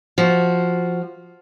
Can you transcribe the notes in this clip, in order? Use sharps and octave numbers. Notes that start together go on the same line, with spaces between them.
F3 F#4